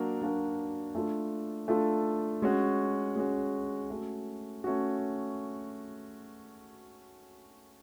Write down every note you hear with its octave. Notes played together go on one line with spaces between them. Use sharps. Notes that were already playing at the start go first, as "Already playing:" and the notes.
Already playing: F#3 A#3 D4 F#4 A#4
F#3 A#3 D4 F#4 A#4
A3 D4 F4 A4
A3 D4 F4 A4
G#3 C#4 F#4
G#3 C#4 F#4
A3 C#4 F#4
A3 C#4 F#4